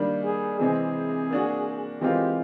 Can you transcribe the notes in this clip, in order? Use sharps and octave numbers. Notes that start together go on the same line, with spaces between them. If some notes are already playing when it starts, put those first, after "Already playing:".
Already playing: D#3 G3 A#3 D4
G#4
C3 E3 G#3 C4 G#4
A#3 D4 F#4
E3 G#3 C4 F4 G4 A#4